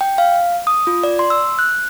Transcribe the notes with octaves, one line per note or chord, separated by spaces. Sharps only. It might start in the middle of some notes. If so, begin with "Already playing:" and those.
G5
F5
D#6
F4
D5
C6
E6
F#6